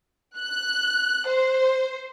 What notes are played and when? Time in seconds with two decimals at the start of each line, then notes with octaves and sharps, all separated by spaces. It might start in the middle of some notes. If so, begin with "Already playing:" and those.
0.39 F#6
1.28 C5